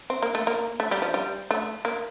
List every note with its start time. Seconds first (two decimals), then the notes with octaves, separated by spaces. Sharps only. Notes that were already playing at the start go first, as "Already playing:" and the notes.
0.10 C4
0.22 A#3
0.35 A3
0.47 A#3
0.80 A3
0.91 G3
1.02 F3
1.14 G3
1.51 A3
1.85 A#3